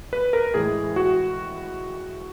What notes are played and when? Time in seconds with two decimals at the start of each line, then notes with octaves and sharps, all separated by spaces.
0.13 B4
0.33 A#4
0.54 A2 E3 G#3 G#4
0.96 F#4